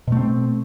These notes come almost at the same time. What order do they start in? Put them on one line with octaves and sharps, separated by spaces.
B2 A3 C4